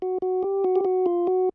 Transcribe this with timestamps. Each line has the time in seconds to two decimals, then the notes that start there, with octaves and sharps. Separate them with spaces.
0.02 F#4
0.22 F#4
0.43 G4
0.64 F#4
0.76 G4
0.85 F#4
1.06 F4
1.27 F#4